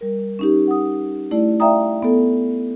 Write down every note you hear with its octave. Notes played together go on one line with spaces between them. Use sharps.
G3 A#4
C#4 D#4 G4
F#5 D#6
A3 E4 D5
D5 E5 F5 G5 A#5 D#6
B3 A4